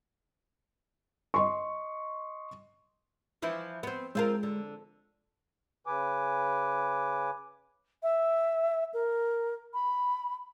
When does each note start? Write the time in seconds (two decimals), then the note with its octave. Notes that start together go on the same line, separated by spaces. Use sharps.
1.34 D#5 C6 C#6
3.42 E3 F3 E4
3.83 B3 C4
4.15 G#3 C4 F4 A#4
4.43 D3
5.87 C#3 B4 G#5 D6
8.03 E5
8.94 A#4
9.74 B5